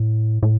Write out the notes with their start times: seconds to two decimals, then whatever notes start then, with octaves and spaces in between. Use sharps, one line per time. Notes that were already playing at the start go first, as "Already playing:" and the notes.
Already playing: A2
0.43 A2